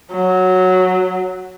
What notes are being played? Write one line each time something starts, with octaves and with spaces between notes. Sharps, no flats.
F#3